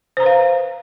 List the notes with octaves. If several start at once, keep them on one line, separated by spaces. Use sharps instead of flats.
B4 C5 F5 A#5